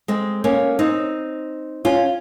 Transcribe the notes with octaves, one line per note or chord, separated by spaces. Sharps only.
G#3 C4
A#3 C#4
C4 D#4
C#4 F4